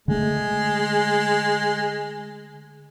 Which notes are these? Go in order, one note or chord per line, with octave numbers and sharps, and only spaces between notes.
D3 G#3 A3